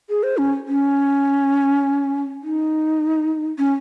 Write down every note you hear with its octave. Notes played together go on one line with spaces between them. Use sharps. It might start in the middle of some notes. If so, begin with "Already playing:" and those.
G#4
C5
C#4
C#4
D#4
C#4